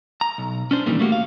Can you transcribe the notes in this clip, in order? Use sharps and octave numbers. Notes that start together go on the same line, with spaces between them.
A#5
B1
C#4 D4 C5
A#2 D#3 E3 G3 A#3
G3 A3 A#3 F#4 G4
F5